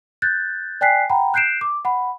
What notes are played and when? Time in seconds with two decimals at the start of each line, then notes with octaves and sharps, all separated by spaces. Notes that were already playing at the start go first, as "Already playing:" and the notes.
0.22 F#6 G6 A6
0.81 D5 G5 G#5 F#6 B6 C7
1.10 F#5 G5 A#5 B5
1.34 F#6 G6 C7 D7 E7
1.61 D6
1.85 F#5 B5